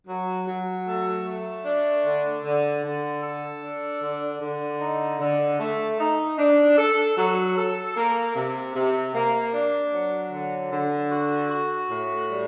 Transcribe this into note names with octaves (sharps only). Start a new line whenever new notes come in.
F#3
F#3
A3
A3
D4
D3
D3
D3
A4
D4
D3
D3
D#4
D3
A3
D#4
D4
A4
F#3
A4
A#3
C3
C3
A#3
D4
F#3
D3
D3
F#4
F#4
A2
G3